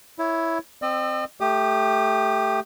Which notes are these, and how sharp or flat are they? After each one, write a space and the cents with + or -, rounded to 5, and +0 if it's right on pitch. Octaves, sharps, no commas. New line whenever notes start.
E4 +0 C#5 +5
C4 +0 D#5 -40 E6 +0
A3 +0 G4 +0 D#6 -45